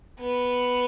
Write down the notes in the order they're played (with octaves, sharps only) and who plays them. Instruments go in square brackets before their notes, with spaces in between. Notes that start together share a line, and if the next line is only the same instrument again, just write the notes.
[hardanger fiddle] B3